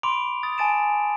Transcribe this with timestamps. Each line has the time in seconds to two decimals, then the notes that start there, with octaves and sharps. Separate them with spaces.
0.03 B5 C6 D6 D7 F7
0.43 D#6 A6
0.58 G#5 A5 A6 D7 E7